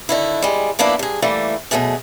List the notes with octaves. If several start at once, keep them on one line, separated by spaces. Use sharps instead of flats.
D3 D#3 E4
G3 G#3
F3 A#3 B3 D4 E4
G2 G#4
E3 G3 A3 A#3
B2 D3 F#3 A3 G#4